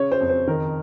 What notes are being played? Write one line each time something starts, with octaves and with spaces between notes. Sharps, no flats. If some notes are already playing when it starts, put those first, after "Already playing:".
Already playing: C#3 C#5
C5
F2
C5
D#3 A#4